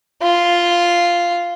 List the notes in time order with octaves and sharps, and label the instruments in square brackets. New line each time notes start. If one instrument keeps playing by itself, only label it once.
[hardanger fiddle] F4